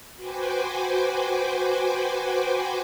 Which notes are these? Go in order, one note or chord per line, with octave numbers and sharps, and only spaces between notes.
F#4 B4 C5 G5 G#5 D6